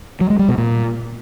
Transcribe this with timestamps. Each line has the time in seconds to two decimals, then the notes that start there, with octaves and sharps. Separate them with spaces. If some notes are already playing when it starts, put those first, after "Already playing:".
0.21 F#3
0.30 G#3
0.39 G3
0.48 B2
0.58 A#2